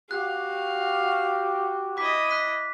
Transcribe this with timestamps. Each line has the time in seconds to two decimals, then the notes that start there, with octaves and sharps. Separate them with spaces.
0.11 F#4 G4 F5 F#6
1.97 E4 D#5 D6 B6
2.30 F#6 B6 D#7